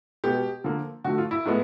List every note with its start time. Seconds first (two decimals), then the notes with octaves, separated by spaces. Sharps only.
0.24 B2 G#3 B3 G4
0.64 D3 F3 A#3
1.05 D3 F3 A3 F#4
1.18 F4
1.31 E4
1.45 A2 F3 G#3 B3